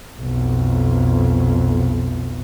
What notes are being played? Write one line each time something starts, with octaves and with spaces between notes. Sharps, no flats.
B1 F2